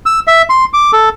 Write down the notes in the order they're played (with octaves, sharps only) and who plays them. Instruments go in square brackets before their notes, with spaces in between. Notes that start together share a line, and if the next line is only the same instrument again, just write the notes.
[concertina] E6
E5
C6
D6
A4